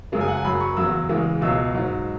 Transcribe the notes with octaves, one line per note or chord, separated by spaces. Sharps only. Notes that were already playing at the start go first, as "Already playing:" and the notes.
F#2 C#3 G#3
G#5
F#5
G#5
F#2 F#3 B5
C#6
E2 C#3 F#3 E6
E2 C#3 E3 G#3
C#2 B2 F#3 E6
G#2 F#3